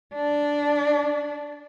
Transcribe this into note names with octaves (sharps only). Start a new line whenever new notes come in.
D4